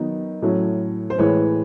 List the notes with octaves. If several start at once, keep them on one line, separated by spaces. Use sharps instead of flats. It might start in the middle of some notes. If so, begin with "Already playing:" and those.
Already playing: D#3 F#3 B3 D#4
A2 F#3 A3 C#4
C5
A2 E3 G#3 B4 C#5